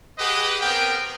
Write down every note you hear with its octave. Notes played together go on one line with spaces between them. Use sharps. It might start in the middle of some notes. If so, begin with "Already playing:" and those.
G4 G#4 B4 D#5 F#5
B3 C4 A#4 G5